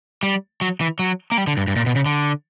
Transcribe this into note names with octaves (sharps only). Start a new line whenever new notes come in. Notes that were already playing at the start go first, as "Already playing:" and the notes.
G3
F#3
E3
F#3
A#3
G3
D3
G2
G2
A#2
B2
C#3
D3